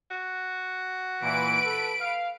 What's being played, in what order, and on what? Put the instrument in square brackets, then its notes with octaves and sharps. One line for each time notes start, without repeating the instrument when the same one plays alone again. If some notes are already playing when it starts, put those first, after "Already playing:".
[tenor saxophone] F#4
[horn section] A#2 E3 [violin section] B4 D7
[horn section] A4
F5